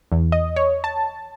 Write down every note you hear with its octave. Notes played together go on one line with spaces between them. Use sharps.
E2
D#5
C#5
A5